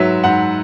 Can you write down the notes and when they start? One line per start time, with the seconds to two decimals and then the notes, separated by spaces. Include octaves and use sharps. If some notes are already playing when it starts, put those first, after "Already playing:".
Already playing: G#2 F#3 B4 E5
0.24 G#2 F#5